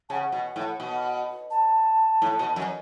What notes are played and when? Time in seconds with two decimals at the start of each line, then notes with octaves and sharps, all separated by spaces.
0.09 C#3 A5
0.13 F#5
0.32 B2
0.56 A2
0.80 B2
1.51 A5
2.22 A2
2.39 B2
2.56 F#2